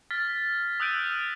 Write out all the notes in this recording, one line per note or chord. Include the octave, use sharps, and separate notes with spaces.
F6 A6 B6
D#6 E6 F#6 G6 D7 D#7